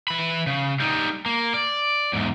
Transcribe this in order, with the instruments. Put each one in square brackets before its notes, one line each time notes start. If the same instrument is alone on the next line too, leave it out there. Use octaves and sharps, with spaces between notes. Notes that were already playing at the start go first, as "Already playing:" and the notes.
[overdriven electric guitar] E3 B5
C#3
G3 D#4
A#3
D5
E2 G#2